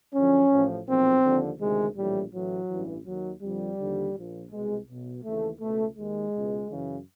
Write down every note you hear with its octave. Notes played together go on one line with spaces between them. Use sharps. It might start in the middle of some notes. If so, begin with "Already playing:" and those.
F#2 D3 F3 C#4
A1 A2 F3
B1 A#2 F3 C4
D#2 D3 F3
D2 C3 D#3 G#3
A#1 A2 E3 G3
A1 A2 E3 F#3
A1 G2 E3
D#2 D#3 F#3
F2 D3 F3 G3
D#2 D3 F3
A#1 A#2 F3
C2 B2 G#3
B1 B2
D#2 C#3 E3 A3
C#2 B2 A3
D#2 D#3 G#3
C#2 B2
F#2 C#3 E3